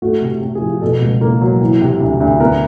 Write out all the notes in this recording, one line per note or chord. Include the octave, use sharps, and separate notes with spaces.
A3 F#4
C3
C3
G#4
F3
B2 A4
C#2
A#3
F#3
E3
C3
D2
D2
B3 A#4